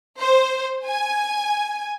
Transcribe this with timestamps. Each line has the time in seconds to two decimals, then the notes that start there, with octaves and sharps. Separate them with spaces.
0.20 C5
0.87 G#5